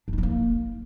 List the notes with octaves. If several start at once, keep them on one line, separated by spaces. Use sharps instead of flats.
D4
D#4
A3
A#3